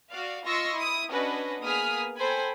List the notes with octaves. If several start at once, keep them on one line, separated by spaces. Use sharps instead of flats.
F#4 D5 F5
F4 D#5 C6 C#6 E6 A#6
E4 D#6
C#4 D4 F#4 B4 D#5
A#3 B3 G#4 D#6 F6 B6
A4 C5 G5 G#5 B5